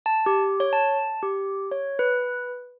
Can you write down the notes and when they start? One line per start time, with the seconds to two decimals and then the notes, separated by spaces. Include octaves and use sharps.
0.06 A5
0.26 G4
0.60 C#5
0.73 A5
1.23 G4
1.72 C#5
1.99 B4